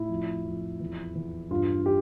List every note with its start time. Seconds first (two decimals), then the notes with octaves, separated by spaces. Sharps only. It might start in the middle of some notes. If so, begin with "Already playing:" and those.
Already playing: A2 E4
0.09 F2
0.45 F2
0.80 E2
1.15 E2
1.51 G2 F4
1.86 G4